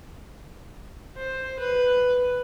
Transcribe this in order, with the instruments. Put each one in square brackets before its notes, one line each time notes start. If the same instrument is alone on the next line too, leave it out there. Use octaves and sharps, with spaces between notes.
[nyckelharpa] C5
B4